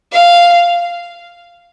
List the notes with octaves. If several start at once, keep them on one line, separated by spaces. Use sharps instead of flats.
F5